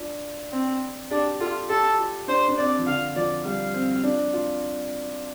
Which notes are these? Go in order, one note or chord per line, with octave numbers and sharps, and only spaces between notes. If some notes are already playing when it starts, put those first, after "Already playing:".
Already playing: D4 F4
C4
D4 G4
F4 A4
G4 A4
F4
D4 C5
D4
C4 D5
F3
D3 F5
F3 D5
G3 F5
C4
D4
F4